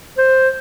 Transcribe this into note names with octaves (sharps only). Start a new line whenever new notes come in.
C5